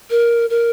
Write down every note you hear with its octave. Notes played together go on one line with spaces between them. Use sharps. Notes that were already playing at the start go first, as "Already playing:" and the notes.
A#4
A#4